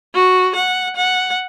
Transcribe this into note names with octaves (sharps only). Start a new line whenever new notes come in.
F#4
F#5
F#5